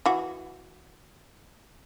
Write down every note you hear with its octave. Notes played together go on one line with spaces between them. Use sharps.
E3 F#4